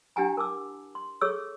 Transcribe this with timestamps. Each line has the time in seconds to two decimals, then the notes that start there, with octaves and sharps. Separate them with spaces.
0.16 D4 E4 G4 F#5 G#5 A#5
0.37 A#4 A5 D6 E6
0.95 C6
1.21 G#4 A4 C#5 C#6 E6